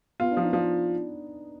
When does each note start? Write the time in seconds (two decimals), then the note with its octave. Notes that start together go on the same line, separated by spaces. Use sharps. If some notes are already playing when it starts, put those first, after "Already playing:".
0.20 B3 F4
0.31 D4
0.37 F3
0.43 D#4
0.53 F3 D4